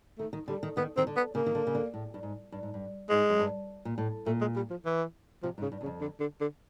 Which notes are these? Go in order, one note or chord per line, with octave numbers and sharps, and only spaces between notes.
D#3 A3
D#3
D3 G3
D#3
D#3 B3
D#3 C4
D3
B3
C#3 A#3
D#3
D3
C#3
D3
A2
G2
G#2
G2
G#2
G2
G#2 G#3
F#2
G2
A#2
A2
A#2 A3
G#3
G3
F3
E3
C3 F3
G#2
C#3
G2
E2 C#3
F2
D3
D3
D3